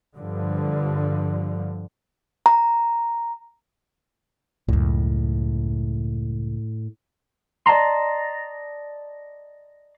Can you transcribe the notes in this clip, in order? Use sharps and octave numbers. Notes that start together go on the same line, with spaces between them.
G2 D3 F3
A#5
C#2 F#2 A2
D5 D#5 A5 A#5 C6